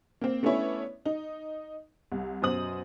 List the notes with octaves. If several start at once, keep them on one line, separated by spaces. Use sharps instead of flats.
A#3 C4
A3 B3 C#4 D4 E4 C#5
D#4
C2
F#2 B2 C5 D#6 F#7